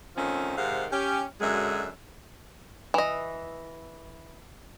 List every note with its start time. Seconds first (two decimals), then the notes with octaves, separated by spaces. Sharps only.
0.16 D#3 F3 A3 C4 C#4
0.57 G#2 C3 D#3 F5 F#5
0.91 C#4 G4
1.41 F#2 D3 F#3 G#3 E5
2.94 E3 D#5